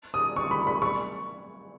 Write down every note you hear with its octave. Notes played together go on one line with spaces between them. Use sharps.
D#6
C#6
B5
B5
C#6